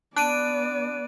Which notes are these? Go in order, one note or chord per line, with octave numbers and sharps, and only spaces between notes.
B3 D4 D5 F#6 D7 D#7